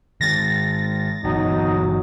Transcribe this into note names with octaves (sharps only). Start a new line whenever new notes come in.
D#3 G#3 A6 A#6
G1 B2 E3 F#3 D#4